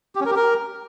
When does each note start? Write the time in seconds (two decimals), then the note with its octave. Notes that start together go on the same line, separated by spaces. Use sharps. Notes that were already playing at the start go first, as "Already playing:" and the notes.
0.15 G4
0.21 C#4
0.26 A#4
0.31 G4
0.36 A#4